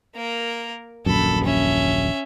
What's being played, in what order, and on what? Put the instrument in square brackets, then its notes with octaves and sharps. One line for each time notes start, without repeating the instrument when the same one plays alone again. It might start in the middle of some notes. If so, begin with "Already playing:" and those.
[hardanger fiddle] A#3 A#4
[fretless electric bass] D#1 A#1 F#2 [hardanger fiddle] A4 B5
[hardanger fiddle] C#4 E5